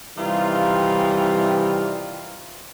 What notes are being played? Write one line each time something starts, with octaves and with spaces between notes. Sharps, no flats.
C3 D#3 E3 G3 D#4 F4